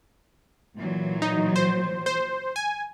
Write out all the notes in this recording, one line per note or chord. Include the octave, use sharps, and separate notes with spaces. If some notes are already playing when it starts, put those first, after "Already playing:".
A#2 E3 F#3
D#4
C5
C5
G#5